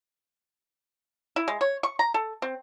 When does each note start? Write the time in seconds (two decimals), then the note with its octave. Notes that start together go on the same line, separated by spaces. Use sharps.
1.36 E4
1.48 G#3
1.61 C#5
1.83 C#6
1.99 A#5
2.14 A4
2.42 C4